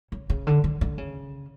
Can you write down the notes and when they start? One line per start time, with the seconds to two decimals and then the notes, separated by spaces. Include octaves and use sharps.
0.12 C#3
0.30 C#3
0.47 D3
0.64 D3
0.81 D3
0.98 C#3